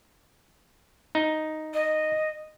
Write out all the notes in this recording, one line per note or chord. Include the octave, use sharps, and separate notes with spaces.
D#4
D#5